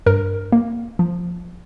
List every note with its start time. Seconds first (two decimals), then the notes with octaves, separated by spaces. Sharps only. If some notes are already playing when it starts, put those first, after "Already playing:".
0.06 G2 A#4
0.52 A#3
0.99 F3